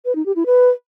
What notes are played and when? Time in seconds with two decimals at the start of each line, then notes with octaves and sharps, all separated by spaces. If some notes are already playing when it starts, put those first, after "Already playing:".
0.05 B4
0.15 D#4
0.26 G4
0.36 E4
0.46 B4